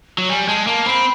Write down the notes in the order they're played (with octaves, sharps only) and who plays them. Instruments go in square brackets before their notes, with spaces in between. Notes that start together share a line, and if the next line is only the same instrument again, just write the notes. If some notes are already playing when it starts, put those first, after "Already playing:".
[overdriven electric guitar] F#3
[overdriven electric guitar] G3 [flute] G#5
[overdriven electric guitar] G#3 [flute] A5
[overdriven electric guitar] A#3 [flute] A5
[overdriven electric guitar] C4 [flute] B5